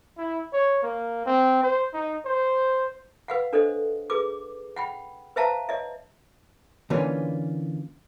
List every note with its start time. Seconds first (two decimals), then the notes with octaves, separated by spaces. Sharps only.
0.18 E4
0.53 C#5
0.83 A#3
1.26 C4
1.63 C5
1.93 D#4
2.25 C5
3.28 B4 F5 F#5
3.53 D4 A4 C5 D#5
4.10 G#4 B4 D6
4.76 F#5 G5 B5
5.36 B4 C5 E5 F5 A5 A#5
5.69 C#5 D#5 E5
6.90 D3 E3 A#3 C#4 F4 B4